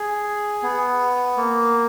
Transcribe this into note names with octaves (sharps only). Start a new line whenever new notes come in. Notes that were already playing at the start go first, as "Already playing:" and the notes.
Already playing: G#4
B3
A#3